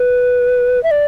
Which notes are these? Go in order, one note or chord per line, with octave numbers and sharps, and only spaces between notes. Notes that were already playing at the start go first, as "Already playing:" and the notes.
Already playing: B4
E5
D5